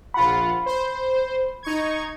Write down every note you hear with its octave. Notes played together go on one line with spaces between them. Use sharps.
A#1 F4 F#5 B5
C5
D#4 C#6 G#6